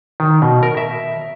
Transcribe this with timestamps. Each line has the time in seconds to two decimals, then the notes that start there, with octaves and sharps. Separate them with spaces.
0.20 D#3
0.42 B2
0.63 A#4
0.77 E5